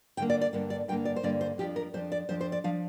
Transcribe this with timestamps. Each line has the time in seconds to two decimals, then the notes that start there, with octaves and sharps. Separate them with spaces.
0.17 G2 D3 A#3 G5
0.30 D5
0.41 D5
0.53 G2 D3 A#3
0.70 D5
0.88 G2 D3 A#3 G5
1.05 D5
1.16 C5
1.23 G2 D3 A#3 D5
1.41 C5
1.58 F2 F3 D4 G4
1.76 A#4
1.94 F2 F3 D4 C5
2.12 D5
2.29 F2 F3 D4 C5
2.41 C5
2.52 D5
2.64 F3 D4 F5